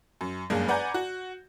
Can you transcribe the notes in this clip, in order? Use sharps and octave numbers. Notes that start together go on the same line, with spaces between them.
F#2
F#1 G2 G#3 A#3 G#4
B4 D5 F#5 G#5 A#5 G6
F#4